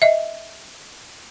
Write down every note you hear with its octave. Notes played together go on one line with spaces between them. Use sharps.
D#5 E5